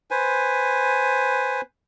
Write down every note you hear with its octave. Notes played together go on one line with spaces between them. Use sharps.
B4 C5 G#5